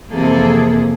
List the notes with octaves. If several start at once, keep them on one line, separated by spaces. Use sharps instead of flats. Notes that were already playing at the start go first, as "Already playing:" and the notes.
F2 C3 E3 A#3 G#4 A4